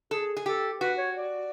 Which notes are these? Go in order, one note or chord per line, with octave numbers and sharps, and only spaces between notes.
G#4 A4
G#4
G4 A4
F#4 B4
C#5
D5